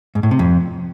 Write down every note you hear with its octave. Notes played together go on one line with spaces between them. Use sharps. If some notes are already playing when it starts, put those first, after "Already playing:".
G#2
A2
C3
F2